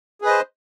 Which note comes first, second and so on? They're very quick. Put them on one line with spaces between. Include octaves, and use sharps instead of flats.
G#4 B4 D#5 C5